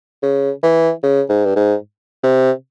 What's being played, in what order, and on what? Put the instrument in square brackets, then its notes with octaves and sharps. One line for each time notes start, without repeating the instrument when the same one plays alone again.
[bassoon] C#3
E3
C#3
G#2
G2
G#2
C3